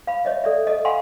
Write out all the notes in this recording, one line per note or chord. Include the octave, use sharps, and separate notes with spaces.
F5 B5
C#5 D#5 E5
A4 D5 E5
A4 D#5
F5 F#5 G#5 B5 C6